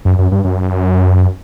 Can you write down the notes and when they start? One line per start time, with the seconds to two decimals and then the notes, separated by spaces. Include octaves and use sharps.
0.05 F#2
0.19 F#2
0.32 G2
0.45 F#2